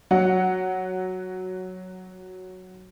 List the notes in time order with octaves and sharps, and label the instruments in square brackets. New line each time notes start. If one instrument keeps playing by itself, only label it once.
[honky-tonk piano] F#3 F#5